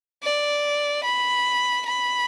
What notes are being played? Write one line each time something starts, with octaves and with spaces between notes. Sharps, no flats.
D5
B5
B5